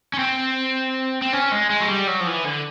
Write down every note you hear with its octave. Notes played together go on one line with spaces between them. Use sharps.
C#4
C4
C4
C#4
G#3
G#3
F#3
G3
F#3
F3
E3
D3